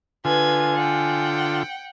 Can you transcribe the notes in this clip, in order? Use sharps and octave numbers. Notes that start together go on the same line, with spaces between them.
D3 F4 B4 G#5 G#6
F#5 G5